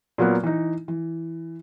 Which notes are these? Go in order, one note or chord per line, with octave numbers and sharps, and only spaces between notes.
A#2 F#3 A#3 B3
E3 D#4
E3